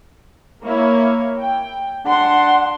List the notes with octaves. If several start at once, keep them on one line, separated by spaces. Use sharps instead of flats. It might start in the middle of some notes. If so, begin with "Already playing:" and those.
A#3 E4 C#5
G5
D4 F#5 C6